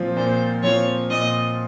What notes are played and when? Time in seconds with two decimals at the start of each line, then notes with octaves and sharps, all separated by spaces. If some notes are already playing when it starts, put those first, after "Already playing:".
Already playing: A#2 F3 C4 F4
0.17 A#2 C5
0.63 F3 C4 F4 C#5
1.10 A#2 D#5